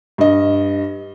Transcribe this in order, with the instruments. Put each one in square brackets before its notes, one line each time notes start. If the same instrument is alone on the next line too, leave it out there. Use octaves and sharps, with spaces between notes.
[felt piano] G2 D#5